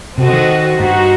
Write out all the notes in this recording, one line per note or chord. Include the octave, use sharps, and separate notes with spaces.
C3 C4 F#4 A4 D#5
D#3
G2 D#4 F#4 C5